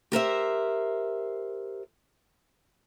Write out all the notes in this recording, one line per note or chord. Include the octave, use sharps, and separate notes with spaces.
G4 A#4 C5 E5